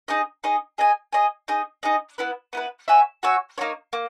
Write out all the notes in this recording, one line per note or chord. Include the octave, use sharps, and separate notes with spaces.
D#4 G#4 D#5
D#4 G#4 D#5
G#4 D#5 G#5
G#4 D#5 G#5
D#4 G#4 D#5
D#4 G#4 D#5
B3 E4 B4
B3 E4 B4
F#4 C#5 E5 G#5
F#4 C#5 E5 G#5
A#3 D#4 F#4 C#5
A#3